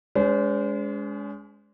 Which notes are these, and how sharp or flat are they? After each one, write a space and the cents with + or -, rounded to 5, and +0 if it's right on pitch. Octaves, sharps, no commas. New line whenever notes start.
G#3 +0 C#4 +45 C5 -30